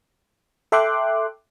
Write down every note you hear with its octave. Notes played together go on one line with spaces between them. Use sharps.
A4 E5 G5 C6 D6 F#6